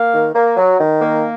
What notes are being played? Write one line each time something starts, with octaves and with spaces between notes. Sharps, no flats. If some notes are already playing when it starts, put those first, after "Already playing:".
Already playing: A#3 F5
D#3
A#3
F#3
D#3
A#3